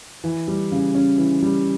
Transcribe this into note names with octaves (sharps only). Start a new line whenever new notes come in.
E3
G3
C#3
C#4
E3
G3